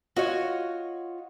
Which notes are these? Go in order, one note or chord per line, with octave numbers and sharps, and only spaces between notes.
F4 F#4 C#5 D#5